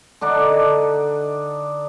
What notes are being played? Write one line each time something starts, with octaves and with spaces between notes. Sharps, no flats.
D3 D4 D#4 D5